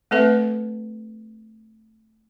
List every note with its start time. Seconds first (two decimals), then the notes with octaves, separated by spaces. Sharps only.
0.11 A3 C4 A4 B4 E5